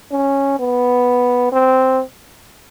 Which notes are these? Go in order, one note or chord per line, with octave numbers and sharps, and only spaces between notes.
C#4
B3
C4